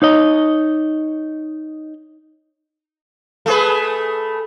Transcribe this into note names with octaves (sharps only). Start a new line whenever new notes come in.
D#4 C#5 D#5
A3 G#4 B4